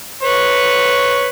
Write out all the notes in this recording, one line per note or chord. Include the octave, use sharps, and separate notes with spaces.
B4 C#5